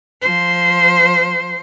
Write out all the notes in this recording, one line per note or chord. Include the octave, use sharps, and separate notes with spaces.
F3 C5